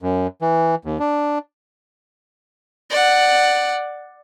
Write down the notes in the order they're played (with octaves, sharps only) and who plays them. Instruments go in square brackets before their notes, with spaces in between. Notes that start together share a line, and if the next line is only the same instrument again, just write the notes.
[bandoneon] F#2
E3
D#2
D4
[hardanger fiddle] D5 F#5